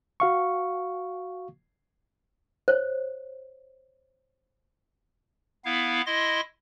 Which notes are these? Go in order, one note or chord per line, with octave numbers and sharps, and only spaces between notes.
F#4 F5 C#6
C5 C#5
B3 E4 F5
E4 D#5 C6 A#6